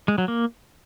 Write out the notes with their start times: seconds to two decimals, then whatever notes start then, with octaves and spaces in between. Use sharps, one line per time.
0.08 G#3
0.18 F#3
0.28 A#3